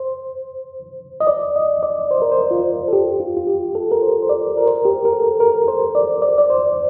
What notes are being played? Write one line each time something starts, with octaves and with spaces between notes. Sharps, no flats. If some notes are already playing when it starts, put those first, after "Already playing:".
Already playing: C5
D#5
D5
D#5
D5
C5
A#4
C5
F4
A4
G4
F4
F4
G4
A4
A#4
C5
C5
D5
A#4
C5
A#4
G4
A#4
A4
A#4
C5
D5
D5
D5
C5